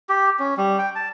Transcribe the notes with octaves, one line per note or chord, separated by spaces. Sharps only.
G4
C#4
G3
G5
A5